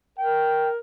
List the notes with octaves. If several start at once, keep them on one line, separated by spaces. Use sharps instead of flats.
A#4 G5